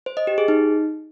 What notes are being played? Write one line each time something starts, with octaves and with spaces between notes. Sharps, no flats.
C5
D#5
G4
G#4
D#4